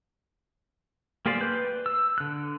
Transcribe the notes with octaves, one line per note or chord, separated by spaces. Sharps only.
A#3 G4 G#4 C5 D5
B4 G6
E6
D3 F#6